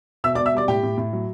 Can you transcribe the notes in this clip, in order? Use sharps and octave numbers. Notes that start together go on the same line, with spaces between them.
B2 E5 E6
D5 D6
B2
E5 E6
G3 D5 D6
A2 G4 G5
A2
A2
F#3